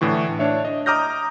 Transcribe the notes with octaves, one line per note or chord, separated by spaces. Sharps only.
A2 D3 E3 C#6
D4 C#5 E5
D#5
A#5 D6 D#6 F6 G6 A#6